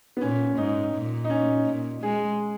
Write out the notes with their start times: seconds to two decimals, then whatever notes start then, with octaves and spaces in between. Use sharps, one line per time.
0.17 B3
0.21 A#2 C#4
0.57 G#2 D#4
0.94 A#2
1.24 D#4
1.30 C#4
1.66 A#2
2.03 G#3 G#4